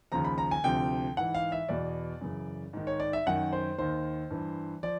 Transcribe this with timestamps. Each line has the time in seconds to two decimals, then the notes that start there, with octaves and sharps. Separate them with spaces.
0.12 D#2 C#3 F3 A#5
0.25 B5
0.38 A#5
0.51 G#5
0.64 D2 C3 F3 G5
1.17 G#2 E3 F#5
1.34 F5
1.52 E5
1.69 E2 B2 D5
2.21 F#2 C#3 E3
2.73 G#2 D#3
2.87 C#5
3.00 D5
3.13 E5
3.26 F#2 D#3 F#5
3.53 C5
3.78 D#2 D#3 C5
4.30 G2 E3
4.83 F3 D5